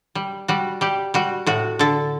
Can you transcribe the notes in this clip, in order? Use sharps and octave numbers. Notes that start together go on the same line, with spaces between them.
G3
G3 F#4
G3 G4
G3 F#4
A2 F#4
D3 A4